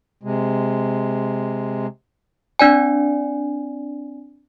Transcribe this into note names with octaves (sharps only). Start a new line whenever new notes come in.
C3 G#3
C4 D4 D5 G#5